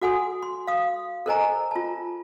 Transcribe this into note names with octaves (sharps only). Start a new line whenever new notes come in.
F#4 A4 F#5 G#5 C6 D#6
C6
F5 D#6
A4 A#4 C5 D#5 G#5 A#5
F4 A5